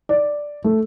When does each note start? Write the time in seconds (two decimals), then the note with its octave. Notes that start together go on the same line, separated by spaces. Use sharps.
0.09 D5
0.64 A3